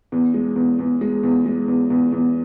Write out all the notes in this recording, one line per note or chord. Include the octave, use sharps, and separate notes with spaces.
E2
G#3
E2
E2
G#3
E2
G#3
E2
E2
E2